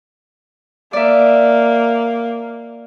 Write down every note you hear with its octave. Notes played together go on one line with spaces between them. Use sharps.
A#3 D5 E5